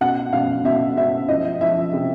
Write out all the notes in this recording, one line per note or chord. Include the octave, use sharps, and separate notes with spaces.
B2 F#5
B2 F5
B2 E5
B2 E5
F3 D#5
F3 E5
C3